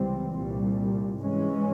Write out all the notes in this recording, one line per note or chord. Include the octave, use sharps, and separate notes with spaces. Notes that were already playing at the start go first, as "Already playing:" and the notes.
Already playing: C#2 C3 E3 G3 C4
C2 A#2 G3
G#2 E3 G#3 C#4